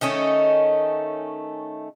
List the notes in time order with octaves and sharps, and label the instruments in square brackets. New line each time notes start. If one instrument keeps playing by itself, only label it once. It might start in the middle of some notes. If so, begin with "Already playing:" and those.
[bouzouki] D#3 A3 C#4 D#4